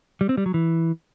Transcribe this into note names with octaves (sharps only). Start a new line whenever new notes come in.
G3
C4
G3
F#3
E3